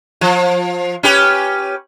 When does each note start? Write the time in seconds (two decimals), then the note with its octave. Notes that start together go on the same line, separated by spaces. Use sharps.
0.21 F3
1.03 C#4 G4 B4